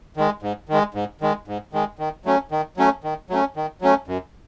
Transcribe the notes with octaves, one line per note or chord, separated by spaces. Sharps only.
D#3 G#3
G#2
D#3 G#3
G#2
D#3 G#3
G#2
D#3 G#3
D#3
F#3 A3 C#4
D#3
F#3 A3 C#4
D#3
F#3 A3 C#4
D#3
F#3 A3 C#4
F#2